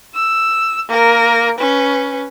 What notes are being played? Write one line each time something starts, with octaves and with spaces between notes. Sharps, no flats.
E6
A#3 A#4
C#4 B4